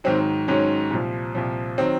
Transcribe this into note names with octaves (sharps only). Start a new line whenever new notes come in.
G#2 D#3 F#3 C4
G#2 D#3 F#3 C#4
C2 A#2 F3
C2 A#2 F3
D#3 F#3 C4